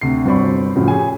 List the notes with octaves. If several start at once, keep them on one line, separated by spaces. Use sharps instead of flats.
D2 C3 C7
G1 F#3 C4 D5 B5 C#6
F#2 A2 C#3 F3 F#3
G4 G#4 C#5 G#5